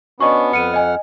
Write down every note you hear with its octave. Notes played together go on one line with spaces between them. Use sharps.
B3 C#4 D4 F#4 D#5 C#6
F2 F#5 F6 C#7 D#7
D#5 G#5